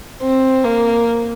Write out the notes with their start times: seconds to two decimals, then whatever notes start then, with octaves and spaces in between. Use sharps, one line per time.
0.22 C4
0.64 A#3